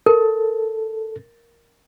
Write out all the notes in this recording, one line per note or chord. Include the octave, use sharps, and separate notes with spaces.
A4 A#4